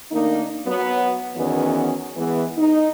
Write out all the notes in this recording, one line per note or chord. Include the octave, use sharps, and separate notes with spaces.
D#3 A3 A#3 D4 D#4
F#3 B3
E2 D#3 E3 F#3 B3 C#4
E3 G#3 B3
D#4